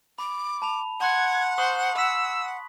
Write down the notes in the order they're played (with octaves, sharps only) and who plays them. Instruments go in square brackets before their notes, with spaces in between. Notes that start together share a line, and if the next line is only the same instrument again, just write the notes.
[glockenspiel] B5 [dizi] D6
[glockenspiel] A5 B5 F7
[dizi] F#5 [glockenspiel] A5 C6 F#6 [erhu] G#6
[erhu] C5 [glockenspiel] C#6 D#6 F#7
[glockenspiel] B5 B6 [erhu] E6